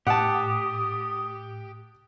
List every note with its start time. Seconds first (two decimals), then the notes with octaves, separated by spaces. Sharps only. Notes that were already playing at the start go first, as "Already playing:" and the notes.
0.07 A2 G4 F#5 A5 D#6